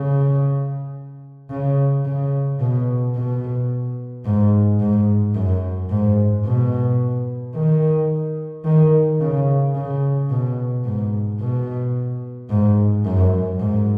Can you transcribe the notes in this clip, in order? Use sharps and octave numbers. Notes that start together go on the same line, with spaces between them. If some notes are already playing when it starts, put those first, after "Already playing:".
Already playing: C#3
C#3
C#3
B2
B2
G#2
G#2
F#2
G#2
B2
D#3
D#3
C#3
C#3
B2
G#2
B2
G#2
F#2
G#2